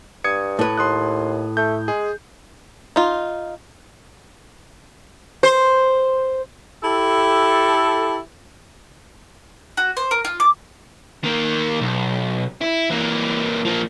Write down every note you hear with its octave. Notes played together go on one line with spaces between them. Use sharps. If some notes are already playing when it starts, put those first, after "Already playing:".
G2 D#6 G#6 C#7
A2 B4
D#2 C6 D#6 F#6
A3 G6
G#3 G#4
D#4 F4
C5
E4 G4 A4
F#4
C5
A#4
F4
D6
D#3 A#3
B1
E4
E3 A#3
F3 A#3